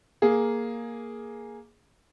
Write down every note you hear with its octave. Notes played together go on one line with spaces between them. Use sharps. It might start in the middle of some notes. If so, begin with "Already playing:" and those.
A#3 G#4